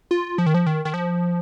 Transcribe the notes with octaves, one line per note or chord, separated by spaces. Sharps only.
F4
F3
D#3
F3
D#3
D#3
F3